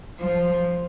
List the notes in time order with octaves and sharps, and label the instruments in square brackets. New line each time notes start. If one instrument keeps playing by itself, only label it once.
[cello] F3